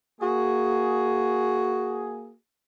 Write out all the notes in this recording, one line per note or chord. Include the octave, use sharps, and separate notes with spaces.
A#3 F#4 G#4